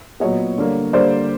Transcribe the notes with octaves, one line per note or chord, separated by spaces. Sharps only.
A#2 F#3 B3 C#5 D#5
D3 G3 A#3
D3 G3 A#3 C5 D5